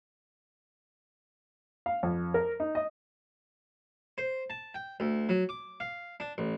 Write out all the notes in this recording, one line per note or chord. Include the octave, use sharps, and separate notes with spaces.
F5
F2
A#4
D#4
D#5
C5
A5
G5
D2
F#3
D6
F5
D4
A1